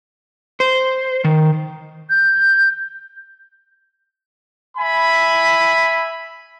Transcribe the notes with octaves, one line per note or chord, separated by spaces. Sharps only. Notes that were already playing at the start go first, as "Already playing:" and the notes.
C5
D#3
G6
E5 G#5 B5